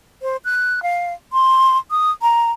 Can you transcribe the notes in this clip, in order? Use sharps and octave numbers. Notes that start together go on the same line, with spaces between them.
C5
F#6
F5
C6
D#6
A#5